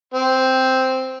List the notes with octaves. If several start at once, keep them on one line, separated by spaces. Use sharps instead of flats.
C4